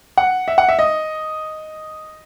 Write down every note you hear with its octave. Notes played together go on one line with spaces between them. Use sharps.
F#5
E5
F#5
E5
D#5